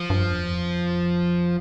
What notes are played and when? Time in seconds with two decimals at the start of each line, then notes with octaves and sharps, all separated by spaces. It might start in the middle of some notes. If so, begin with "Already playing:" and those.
Already playing: F3
0.10 G2
0.30 E2
0.49 F2